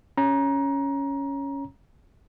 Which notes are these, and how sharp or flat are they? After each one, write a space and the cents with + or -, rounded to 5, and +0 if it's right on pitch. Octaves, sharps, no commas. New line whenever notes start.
C#4 +0 A#5 +20